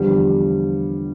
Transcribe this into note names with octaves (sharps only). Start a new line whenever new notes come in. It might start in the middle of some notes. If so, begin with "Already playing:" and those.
Already playing: E2 D3 F3 G3